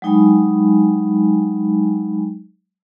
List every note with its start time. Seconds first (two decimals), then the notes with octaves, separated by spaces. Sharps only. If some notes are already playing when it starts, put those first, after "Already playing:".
0.02 F#3 G#3 D#4 G5 G#5 B5